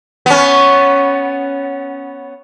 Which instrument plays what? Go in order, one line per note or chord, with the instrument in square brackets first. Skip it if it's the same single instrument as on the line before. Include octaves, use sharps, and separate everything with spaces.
[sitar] B3 C#4